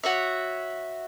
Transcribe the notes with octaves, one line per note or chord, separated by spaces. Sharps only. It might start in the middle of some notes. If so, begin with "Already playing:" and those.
F#4 C#5 E5